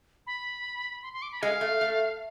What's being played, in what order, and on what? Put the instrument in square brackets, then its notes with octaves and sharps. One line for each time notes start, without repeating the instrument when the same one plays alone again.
[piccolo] B5
C6
C6
D6
B5
[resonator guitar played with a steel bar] G#3 [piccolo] F5
[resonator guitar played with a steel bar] A3
A3